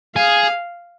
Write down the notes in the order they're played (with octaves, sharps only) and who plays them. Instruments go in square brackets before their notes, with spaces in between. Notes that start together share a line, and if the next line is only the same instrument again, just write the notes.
[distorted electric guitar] G#4 [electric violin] F5